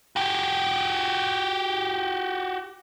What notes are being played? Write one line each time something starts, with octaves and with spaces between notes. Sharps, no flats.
F#4 G4